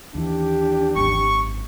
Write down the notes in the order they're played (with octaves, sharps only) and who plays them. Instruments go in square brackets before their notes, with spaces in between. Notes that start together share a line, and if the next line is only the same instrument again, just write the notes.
[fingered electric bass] D#2 E3 [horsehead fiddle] D4 G4
[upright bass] G#1 F#2 [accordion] C#6